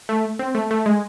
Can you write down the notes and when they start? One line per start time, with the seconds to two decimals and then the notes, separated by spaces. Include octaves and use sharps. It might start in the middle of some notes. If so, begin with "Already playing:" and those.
0.09 A3
0.39 C4
0.55 A3
0.71 A3
0.86 G#3